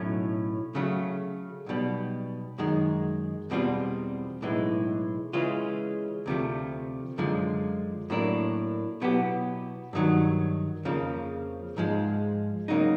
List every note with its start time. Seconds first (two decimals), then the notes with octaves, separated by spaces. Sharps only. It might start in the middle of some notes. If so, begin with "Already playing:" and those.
Already playing: B1 A2 F#3 A3 C#4
0.75 C#3 F#3 A3
1.66 B1 B2 G3
2.58 F#2 D#3 G#3
3.50 E2 B2 G3 C4 F4
4.42 B1 A2 E3 G#3
5.33 C#3 E3 G#3 C#4 F4
6.26 D2 C3 F3 A3
7.18 F#2 D3 F3 G#3
8.10 A2 F#3 A#3 D4
9.01 B2 F#3 B3 E4 G4
9.93 G2 D#3 F#3
10.85 F2 C#3 F3 A#3
11.77 G#2 F3 G#3
12.68 C#3 F#3 A#3 D#4